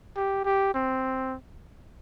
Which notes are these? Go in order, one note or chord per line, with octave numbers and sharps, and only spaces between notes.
G4
G4
C4